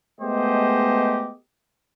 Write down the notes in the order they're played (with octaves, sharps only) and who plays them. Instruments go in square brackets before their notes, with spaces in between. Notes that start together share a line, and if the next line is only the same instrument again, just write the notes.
[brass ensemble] G#3 A3 B3 G4 C5 D#5